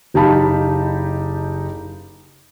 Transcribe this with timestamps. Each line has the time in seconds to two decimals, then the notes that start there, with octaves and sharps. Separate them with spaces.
0.14 F#1 D#4 G4 F5 A5 B5